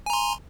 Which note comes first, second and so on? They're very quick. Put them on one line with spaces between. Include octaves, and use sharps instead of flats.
G#5 A#5 C6